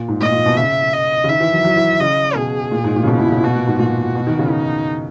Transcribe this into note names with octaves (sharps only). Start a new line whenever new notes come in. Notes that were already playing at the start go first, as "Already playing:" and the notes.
Already playing: A#2
G#2
A#2 D#5
A#2
B2
C#3 E5
D#5
C#3
D#3 E5
E3
F#3
F#3
E3
C#3 D#5
B2 G#4
A#2
G#2
A#2
C#3
B2 E4
B2
C#3
B2 F#4
A#2
G#2
A#2 F#4
B2
D#3
C#3
D#4